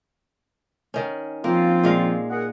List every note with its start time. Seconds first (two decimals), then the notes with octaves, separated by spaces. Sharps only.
0.94 D#3 C#4
1.44 F3 A#3 C4 F4
1.83 A#2 G#3 F5
2.30 G#4 A#4 F#5